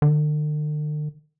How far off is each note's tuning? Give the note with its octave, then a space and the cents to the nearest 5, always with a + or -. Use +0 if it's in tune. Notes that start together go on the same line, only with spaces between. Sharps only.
D3 +45